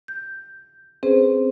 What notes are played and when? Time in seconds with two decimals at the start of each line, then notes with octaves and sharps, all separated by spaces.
0.08 G6
1.03 C4 C#4 G#4 B4 C5